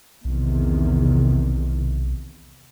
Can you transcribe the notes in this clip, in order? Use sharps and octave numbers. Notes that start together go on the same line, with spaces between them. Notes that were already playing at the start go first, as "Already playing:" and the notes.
B1 E2 C3 D#3